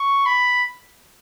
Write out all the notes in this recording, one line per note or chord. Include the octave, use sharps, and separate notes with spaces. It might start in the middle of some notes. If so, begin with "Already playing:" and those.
Already playing: C#6
B5